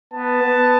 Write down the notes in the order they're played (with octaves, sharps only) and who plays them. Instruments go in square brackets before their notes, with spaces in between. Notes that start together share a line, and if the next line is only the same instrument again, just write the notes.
[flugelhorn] B3 [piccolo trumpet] A5
[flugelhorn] B3